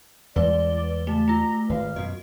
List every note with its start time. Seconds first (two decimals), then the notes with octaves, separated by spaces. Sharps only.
0.36 E2 G3 G#3 B4 D5 G7
1.07 C#3 A3 A5
1.28 A3 F4 A#5
1.69 G#1 B4 F5
1.96 F#2 B2 D#5